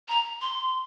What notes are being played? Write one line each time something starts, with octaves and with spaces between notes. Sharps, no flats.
A#5
C6